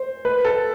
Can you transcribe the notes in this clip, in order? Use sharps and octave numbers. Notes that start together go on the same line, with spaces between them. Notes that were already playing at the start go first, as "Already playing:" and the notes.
Already playing: C5
B4
A4